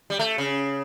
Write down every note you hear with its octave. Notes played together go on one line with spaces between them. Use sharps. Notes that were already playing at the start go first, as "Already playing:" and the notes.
G3
A3
C#3